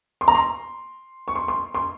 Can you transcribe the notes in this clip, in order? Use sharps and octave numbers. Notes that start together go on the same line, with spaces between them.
C6
A#5
C6
C#6
C6
C6
C6